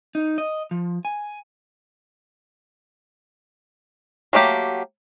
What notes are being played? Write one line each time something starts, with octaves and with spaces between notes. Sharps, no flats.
D#4
D#5
F3
G#5
F#3 A3 A#3 G4